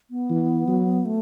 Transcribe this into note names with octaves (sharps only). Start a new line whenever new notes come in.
B3
E3
F#3
A3